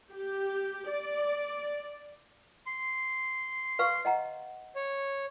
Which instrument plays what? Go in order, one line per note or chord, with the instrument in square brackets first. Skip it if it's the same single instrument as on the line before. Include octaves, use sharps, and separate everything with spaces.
[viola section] G4
D5
[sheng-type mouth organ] C6
[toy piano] B4 F5 C#6
D#5 F#5 A#5
[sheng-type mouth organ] C#5